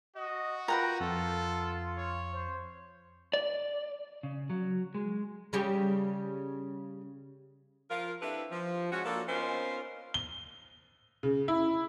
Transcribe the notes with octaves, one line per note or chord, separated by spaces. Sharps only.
F#4 D#5
F4 A#4 B4 F#5 G5 A#5
F2 F4 A4
C#5
C5
D5
C#3
F#3
G#3
C#3 G3 G4
F3 F4 A#4
C4 D4 E4 G4 A4 B4
F3
G#3 C#4 F#4
F3 A#3 D4 A4
B3 C#4 D#4 F4 A#4 C5
G7
C#3
E4